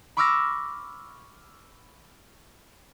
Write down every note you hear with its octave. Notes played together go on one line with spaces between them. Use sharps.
B5 C#6 D6 E6 F6 A#6